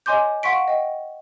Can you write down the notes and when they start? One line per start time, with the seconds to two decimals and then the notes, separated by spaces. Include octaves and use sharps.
0.06 C#5 D#5 G#5 C6 D6 G6
0.43 F5 F#5 C6 C#6 B6 D7
0.68 D#5 G5